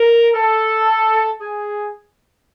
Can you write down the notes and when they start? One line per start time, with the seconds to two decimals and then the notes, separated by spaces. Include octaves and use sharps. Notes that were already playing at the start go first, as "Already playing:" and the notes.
Already playing: A#4
0.35 A4
1.41 G#4